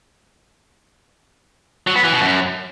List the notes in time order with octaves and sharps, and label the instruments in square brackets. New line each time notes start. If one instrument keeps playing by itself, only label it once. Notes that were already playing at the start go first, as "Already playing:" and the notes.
[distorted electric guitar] F#3
B3
E3
B2
F#2